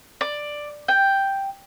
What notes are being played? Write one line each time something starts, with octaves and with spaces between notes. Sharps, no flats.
D5
G5